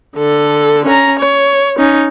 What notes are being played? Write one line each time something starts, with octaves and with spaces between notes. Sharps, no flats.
D3 A4
C#4 A#5
C#5
C#4 D#4